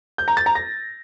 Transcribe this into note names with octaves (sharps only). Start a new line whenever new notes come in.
G6
A#5
A6
A#5
A#6